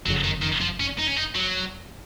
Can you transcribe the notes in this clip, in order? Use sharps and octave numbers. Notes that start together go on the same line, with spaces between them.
F#1 F2 C#3 F#3
D#3
D#3
F3
C#4
D#4
C#4
D#4
F#3